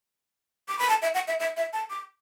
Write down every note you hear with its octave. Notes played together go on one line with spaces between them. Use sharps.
D6
B5
A5
E5
F#5
E5
E5
E5
A5
D6